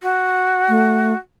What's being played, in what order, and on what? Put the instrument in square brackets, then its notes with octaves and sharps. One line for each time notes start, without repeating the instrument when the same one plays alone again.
[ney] F#4
[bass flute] A3